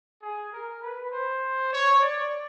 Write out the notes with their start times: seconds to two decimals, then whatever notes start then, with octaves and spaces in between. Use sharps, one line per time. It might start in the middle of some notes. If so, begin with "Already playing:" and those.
0.23 G#4
0.53 A#4
0.82 B4
1.12 C5
1.72 C#5
2.01 D5